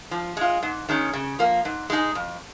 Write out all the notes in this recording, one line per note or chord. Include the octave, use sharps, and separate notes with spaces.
F3
G#3 F4
G#2
D#3 G#3 C#4
C#3
F3 A#3
G#2
G#3 D#4 G#4
F2